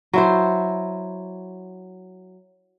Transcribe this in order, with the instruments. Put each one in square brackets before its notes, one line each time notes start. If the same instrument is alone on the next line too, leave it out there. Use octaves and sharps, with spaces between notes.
[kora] F#3 E4 C5